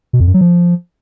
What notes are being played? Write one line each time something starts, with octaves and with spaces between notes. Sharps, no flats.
B2
F2
F#2
F#3
F3